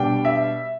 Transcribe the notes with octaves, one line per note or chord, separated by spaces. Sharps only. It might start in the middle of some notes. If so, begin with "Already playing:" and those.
Already playing: B2 G3 D4 G5
E5